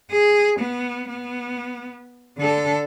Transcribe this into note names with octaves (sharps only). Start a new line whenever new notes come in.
G#4
B3
B3
D3 A4